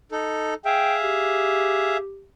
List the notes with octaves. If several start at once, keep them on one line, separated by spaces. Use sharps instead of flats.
D#4 A4
G#4 E5 F5 G5
G4